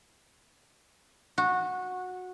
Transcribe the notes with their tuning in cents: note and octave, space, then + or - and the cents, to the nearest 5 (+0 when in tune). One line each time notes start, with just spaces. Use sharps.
F#4 -15